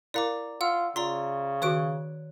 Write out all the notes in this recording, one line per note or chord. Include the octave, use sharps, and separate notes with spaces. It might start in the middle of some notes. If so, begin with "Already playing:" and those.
E4 A#4 D5 F5 A#5 D6
F4 F#5 E6
C#3 F4 D5 A#5 C6
D#3 F#4 C#5 D6 F#6 D7